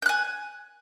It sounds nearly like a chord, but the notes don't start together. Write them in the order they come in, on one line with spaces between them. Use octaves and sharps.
G6 F#6 G#5